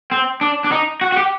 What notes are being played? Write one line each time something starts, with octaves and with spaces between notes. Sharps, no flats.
C4
D4
D4
D#4
F#4
F#4
G4